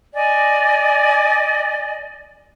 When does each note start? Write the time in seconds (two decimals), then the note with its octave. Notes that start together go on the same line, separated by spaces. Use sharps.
0.14 D5 D#5 G#5